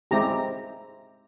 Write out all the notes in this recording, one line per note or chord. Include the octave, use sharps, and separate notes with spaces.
G#3 C4 E4 G4 A#5